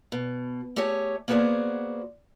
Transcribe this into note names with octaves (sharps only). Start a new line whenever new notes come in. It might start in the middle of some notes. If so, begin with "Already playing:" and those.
B2
A3 G4 G#4 C#5 G#5
A#3 B3 F#4 G#4 C5 D5